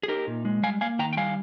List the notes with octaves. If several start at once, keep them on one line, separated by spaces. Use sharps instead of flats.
G#4
D#4 G4 A#4
A#2
G#3
G3 F5 G#5
A#3 F5 G#5
D#3 G5 A#5
G5
G3 F5 G#5